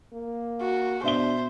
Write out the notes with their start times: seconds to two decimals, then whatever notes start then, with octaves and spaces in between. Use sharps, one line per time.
0.13 A#3
0.61 F#4
1.03 B2 D4 C5 E5 G7